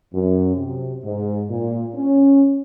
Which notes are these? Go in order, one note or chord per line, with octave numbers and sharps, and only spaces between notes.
F#2
C3
G#2
A#2
C#4